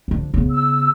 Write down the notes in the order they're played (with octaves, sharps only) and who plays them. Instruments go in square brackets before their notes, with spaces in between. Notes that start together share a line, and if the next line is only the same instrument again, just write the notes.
[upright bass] D3 F3
C#3 B3
[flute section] E6